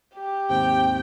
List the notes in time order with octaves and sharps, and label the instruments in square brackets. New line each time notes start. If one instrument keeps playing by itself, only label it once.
[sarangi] G4
[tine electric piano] D#2 G#2 C4 [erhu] G5